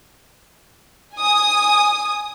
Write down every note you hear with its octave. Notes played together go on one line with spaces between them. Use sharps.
G#5 D#6